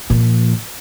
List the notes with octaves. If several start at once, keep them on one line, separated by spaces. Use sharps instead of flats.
A#2 F3